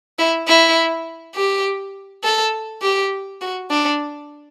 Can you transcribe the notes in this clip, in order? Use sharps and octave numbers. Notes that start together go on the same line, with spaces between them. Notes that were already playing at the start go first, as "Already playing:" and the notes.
E4
E4
G4
A4
G4
F#4
D4